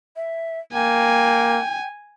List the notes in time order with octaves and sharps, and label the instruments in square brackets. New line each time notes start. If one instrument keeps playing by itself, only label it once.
[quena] E5
[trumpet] A#3 [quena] G5 [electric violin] G#5